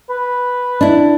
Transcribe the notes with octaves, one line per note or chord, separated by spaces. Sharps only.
B4
D4 E4